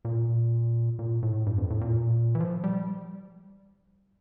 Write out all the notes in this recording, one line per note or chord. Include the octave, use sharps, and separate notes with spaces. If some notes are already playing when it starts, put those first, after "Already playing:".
A#2
A#2
A2
G2
F2
A2
A#2
E3
F3
G3